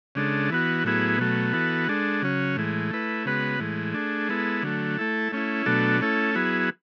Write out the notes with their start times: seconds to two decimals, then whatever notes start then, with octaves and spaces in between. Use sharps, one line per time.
0.15 C#3 G#3 D4 A4
0.50 E3 B3 F#4
0.84 A2 F#3 B3 E4 G#4
1.18 B2 F#3 A3
1.53 E3 B3 F#4 A4
1.88 G#3 D4 A4
2.22 C#3 F#3 C#4
2.56 A2 E3 G#3
2.91 A3 E4 B4
3.25 C#3 G#3 B3 F#4 B4
3.60 A2 E3 G#3
3.94 A3 D4 G#4
4.29 G#3 B3 E4 A4
4.63 D3 F#3 A3
4.97 A3 E4 A4
5.32 A3 C#4 E4
5.66 B2 F#3 A3 D4 A4
6.01 A3 C#4 E4 A4
6.35 F#3 B3 E4 G#4